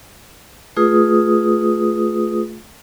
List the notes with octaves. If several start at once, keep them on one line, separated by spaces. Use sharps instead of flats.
A3 F4 G#4 B4 D#6